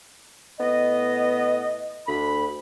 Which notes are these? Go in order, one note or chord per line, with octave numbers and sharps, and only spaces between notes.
A2 B3 D#5
D2 B5